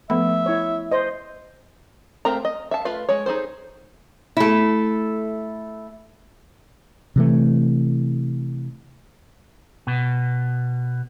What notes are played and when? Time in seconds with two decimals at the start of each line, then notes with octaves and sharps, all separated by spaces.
0.10 F3 A3 B3 E5 B5
0.46 E4 C#5
0.91 C5 D#5
2.25 A3 C4 A#4 F5 A#5
2.45 D#5
2.71 E5 F5 A5
2.85 A3 F4 B4 F5
3.09 G#3 C#5
3.26 D#4 G#4 A4 C5
4.37 A3 E4
7.16 C3 E3 A3
9.87 B2